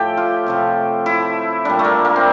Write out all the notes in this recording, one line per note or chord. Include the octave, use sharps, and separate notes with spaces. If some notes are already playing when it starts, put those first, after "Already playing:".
Already playing: A2 F3 A3 G4 A4
F4
C3 F3 A3
E4
A#2 G3 D4
A3
A#3
A#3
C4